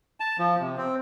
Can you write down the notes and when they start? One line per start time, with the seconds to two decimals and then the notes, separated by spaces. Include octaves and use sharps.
0.20 A5
0.39 F3
0.60 C3
0.78 C4